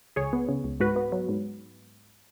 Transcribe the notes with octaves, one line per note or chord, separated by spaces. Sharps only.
C#2 G#4 C#5
B3
C#3
C#2
G#2 F#4 B4
B3
F#3
G#2